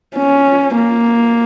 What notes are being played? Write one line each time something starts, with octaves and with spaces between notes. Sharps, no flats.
C#4
A#3